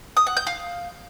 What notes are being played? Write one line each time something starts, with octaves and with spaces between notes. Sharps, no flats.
D#6
F#5
G6
F5